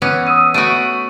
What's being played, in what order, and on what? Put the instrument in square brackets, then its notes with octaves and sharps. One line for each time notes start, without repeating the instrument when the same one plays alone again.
[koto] E3 B3 C#4
[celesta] D#6 E6 D#7
[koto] A3 B3 F#4 [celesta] C#6 D7 D#7